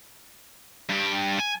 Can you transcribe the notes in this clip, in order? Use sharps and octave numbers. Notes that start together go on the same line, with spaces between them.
G2 G4
G#5